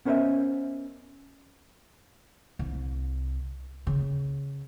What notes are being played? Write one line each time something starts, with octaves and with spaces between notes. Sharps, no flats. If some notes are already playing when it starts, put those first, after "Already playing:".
B3 C#4 A#4 C5 D#5 E5
C2
C#3